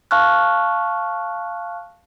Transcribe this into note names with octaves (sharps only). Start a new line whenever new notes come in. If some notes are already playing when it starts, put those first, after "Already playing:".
F5 A5 C#6 F6 F#6